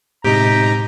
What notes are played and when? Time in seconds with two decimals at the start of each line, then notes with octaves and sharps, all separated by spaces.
0.24 A2 C3 G#3 D#4 G4 A#5